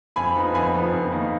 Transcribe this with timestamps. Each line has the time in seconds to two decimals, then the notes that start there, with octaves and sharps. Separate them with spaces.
0.16 F2 G#5 B5
0.35 F3 B3 D#4
0.54 F2 G#5 B5
0.74 F3 B3 D#4
0.94 F2
1.12 D#3 A#3 D#4